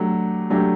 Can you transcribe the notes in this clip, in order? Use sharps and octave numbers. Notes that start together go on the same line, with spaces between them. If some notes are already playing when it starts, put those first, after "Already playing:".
Already playing: F#3 A3 D4 G4
F#3 A3 D4 G4